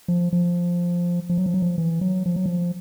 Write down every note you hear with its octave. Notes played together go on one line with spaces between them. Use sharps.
F3
F3
F3
F#3
F3
F#3
F3
E3
F#3
F3
F#3
F3